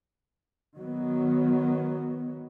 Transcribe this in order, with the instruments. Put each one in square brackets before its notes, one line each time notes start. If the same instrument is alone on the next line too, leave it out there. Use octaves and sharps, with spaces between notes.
[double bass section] D#3 F#3 B3